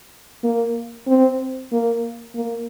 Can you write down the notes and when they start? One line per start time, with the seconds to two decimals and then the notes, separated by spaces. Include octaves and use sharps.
0.43 A#3
1.07 C4
1.72 A#3
2.35 A#3